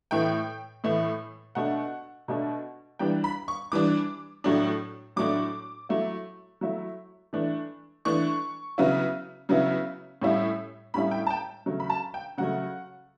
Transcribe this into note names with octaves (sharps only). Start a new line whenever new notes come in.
A2 E3 A3 G5
A2 E3 A3
B2 A3 D4 F#5
B2 A3 D4
E3 G3 D4 G5
B5
C#6
E3 G3 D4 D6
A2 F#3 A3 D4
A2 F#3 A3 D4 D6
F#3 A3 E4
F#3 A3 E4
E3 A3 D4
E3 A3 D4 C#6
C#3 F#3 B3 E4
C#3 F#3 B3 E4
A2 G3 C#4 E4
A2 G3 C#4 E4 B5
G5
A5
G5
C#3 F#3 A3
B5
A5
G5
C#3 F#3 A3 F#5